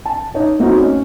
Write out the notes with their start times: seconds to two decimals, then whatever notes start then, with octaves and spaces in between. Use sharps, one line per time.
0.06 A5
0.34 D#4 C#5
0.59 A3 A#3 C4 D#4 F#4
0.77 C#4